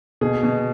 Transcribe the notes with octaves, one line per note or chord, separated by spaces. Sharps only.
B2 G#4
B2